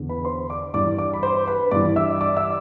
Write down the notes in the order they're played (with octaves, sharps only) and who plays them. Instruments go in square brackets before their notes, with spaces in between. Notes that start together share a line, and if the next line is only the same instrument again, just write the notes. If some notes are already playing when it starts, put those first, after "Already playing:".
Already playing: [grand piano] E2 D3
B4 B5
C5 C6
D5 D6
G2 E3 D5 D6
D5 D6
B5
C5 C6
B4 B5
G2 E3 D5 D6
E5 E6
D5 D6
E5 E6